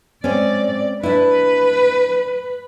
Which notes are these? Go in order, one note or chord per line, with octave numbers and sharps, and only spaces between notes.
G#3 C4 C#4 D5
D4 E4 B4